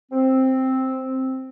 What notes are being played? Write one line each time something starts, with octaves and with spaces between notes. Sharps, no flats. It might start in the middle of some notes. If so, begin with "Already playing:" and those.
C4